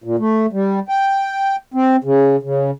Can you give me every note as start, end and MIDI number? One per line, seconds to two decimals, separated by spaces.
0.04 0.16 46
0.19 0.46 57
0.53 0.80 55
0.89 1.56 79
1.74 1.96 60
2.04 2.36 49
2.43 2.71 49